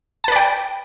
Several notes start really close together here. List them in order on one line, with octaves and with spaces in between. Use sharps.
A5 B4 D5 G5